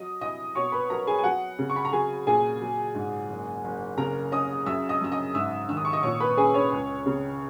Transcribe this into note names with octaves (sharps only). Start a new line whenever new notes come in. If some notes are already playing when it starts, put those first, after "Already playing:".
Already playing: F#3 D#5 D#6
E4 D#5 D#6
B2 C#5 C#6
B4 B5
F#3 A#4 A#5
G#4 G#5
G#5
F#3 F#4 F#5
C#3
C#6
B5
A#5
F#3 G#4 G#5
A#2 G#4 G#5
F#3
G#2
F#1
F#1
C#3 A#4 A#5
C#4 D#5 D#6
F#2 E5 E6
D#5 D#6
F#2 E6
D#5 D#6
G#2 E5 E6
D#3 E6
D#6
C#6
D#5 D#6
A#2 C#5 C#6
B4 B5
C#4 G#4 G#5
C#4 C#5
C#2
C#3